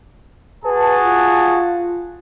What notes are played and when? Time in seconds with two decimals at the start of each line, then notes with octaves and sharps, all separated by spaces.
0.65 F#4 G#4 B4 A5
1.04 F4